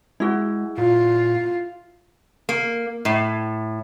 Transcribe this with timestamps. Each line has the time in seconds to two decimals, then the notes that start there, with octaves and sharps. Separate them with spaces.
0.20 G#3 E4 F#4
0.78 A#2 F4
2.49 A#3
3.05 A2